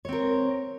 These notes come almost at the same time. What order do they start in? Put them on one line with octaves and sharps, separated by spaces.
C#5 C4 A#4